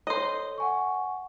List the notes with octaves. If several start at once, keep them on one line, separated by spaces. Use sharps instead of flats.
A4 C5 C#5 D#5
F#5 G#5 C#6